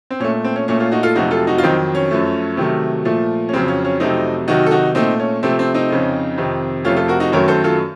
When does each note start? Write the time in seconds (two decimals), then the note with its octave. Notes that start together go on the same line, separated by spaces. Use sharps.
0.10 C4
0.20 A#2 C#4
0.24 A3
0.44 C4
0.56 C#4
0.68 A#2 A3 C#4
0.80 C#4 F4
0.92 D#4 F#4
1.03 F4 A4
1.15 F2 C3 F#3 A3 D#4 F#4
1.31 F4 A4
1.47 D#4 F#4
1.58 F4
1.63 F2 D#3 F#3 C4 D#4
1.95 C#4
2.11 F#2 F3 A3
2.57 C3 D#3 F#3 A3
3.05 A#2 F3 A3
3.49 C#4
3.53 F2 C#3 F#3 C4
3.68 C#4
3.85 C#4
4.00 F2 C3 F#3 A3 C4 D#4
4.48 C3 D#3 F#3 D#4 F#4
4.66 A4
4.71 D#4 F#4
4.95 A#2 A3 C4 D#4
5.20 C#4
5.43 C3 F3 A3 C4
5.59 C4
5.74 C4 D#4
5.90 F2 C#3 F3
6.38 F2 C3 D#3
6.85 F2 C3 F3 A3 C#4 F4
6.97 F4 A4
7.08 F#4 A#4
7.20 D#4 F#4
7.32 F#2 D#3 F#3 A3 A#4 C#5
7.48 A4 C5
7.64 F4 A4